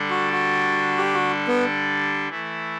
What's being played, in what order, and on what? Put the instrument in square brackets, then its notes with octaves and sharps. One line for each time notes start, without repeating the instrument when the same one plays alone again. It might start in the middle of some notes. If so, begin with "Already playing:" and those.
Already playing: [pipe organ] D3 G3 D4 A4
[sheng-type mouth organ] F#4
F#4
G4
F#4
B3
[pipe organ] E3 A3 E4